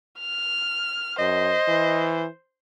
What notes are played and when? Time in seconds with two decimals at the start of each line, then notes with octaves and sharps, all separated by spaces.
0.19 F6
1.19 F#2 C5 D#5
1.68 E3